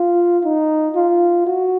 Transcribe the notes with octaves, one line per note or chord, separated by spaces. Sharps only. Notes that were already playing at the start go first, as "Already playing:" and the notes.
Already playing: F4
D#4
F4
F#4